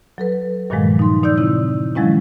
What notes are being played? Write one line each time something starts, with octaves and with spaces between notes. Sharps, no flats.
F#3 A4 B4
G2 A#2 D#3 F3 F#3 G#3
D#4 C6
A#2 D#4 D5 E6 G6
C#3 C4 E4 E6
D#3 F3 F#3 G#3 C#4 E4